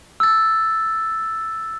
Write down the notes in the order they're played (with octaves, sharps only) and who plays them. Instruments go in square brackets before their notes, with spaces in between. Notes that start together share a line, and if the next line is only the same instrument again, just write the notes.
[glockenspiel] E6 A6